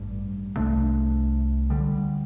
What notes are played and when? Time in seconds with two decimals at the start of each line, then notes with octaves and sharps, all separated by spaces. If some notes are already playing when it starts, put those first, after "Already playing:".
Already playing: A1 G2 G3
0.55 C2 C3 A3 D4
1.70 D2 D3 G3